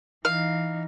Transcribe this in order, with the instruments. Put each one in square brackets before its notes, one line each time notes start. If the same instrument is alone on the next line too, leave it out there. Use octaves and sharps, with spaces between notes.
[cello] E3 D#4 [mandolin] F5